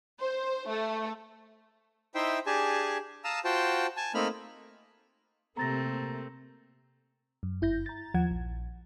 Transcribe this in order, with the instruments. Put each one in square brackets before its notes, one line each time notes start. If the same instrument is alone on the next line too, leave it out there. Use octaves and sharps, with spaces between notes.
[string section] C5
A3
[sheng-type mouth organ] D#4 E4 C5 E5 G5 C6
D4 G4 G#4 G#5 A5
F5 A5 A#5 D#6 E6
F4 F#4 C5 G5 A5
G#5 A5
A3 A#3 C4 D#4 B5 F6
[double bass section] C3 A#3 [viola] A3 C4 [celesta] A#5 A6 A#6
[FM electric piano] F#2
G1 E4 G6 A#6
A#5 A6
D#2 F3 F#5 G#6
A#1